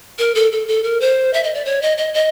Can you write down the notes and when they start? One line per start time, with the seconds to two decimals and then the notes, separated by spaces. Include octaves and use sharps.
0.19 A#4
0.35 A4
0.52 A4
0.68 A4
0.83 A#4
1.01 C5
1.33 E5
1.44 D#5
1.54 D5
1.65 C#5
1.82 D#5
1.98 D#5
2.14 D#5